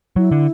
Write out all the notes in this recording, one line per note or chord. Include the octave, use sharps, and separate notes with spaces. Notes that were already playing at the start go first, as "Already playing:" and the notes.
F#3 E4
D3